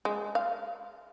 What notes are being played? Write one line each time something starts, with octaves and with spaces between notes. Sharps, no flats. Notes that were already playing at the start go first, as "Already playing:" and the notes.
G#3
F5